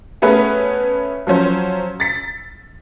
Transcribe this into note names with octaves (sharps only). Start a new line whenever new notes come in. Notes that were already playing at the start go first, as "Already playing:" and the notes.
A3 B3 C#4 G#4 B4
F3 F#3 C#4 C5
A6 B6